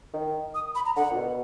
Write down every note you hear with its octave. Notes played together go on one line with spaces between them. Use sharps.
D#3
D#6
B5
A#5
D3 F#5
A#2
B2